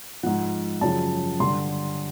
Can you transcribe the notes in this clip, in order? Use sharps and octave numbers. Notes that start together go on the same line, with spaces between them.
G#2 F3 F#5
F#2 C#3 F3 A5
G2 D3 G3 C6